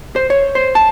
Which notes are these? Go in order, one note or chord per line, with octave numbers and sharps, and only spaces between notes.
C5
C#5
C5
A5